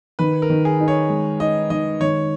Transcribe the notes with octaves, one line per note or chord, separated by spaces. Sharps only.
D#3 B4
A#4
D#3
G#4
D#4
C#5
G#3
D#4 D#5
D#3 D#5
D#3 C#5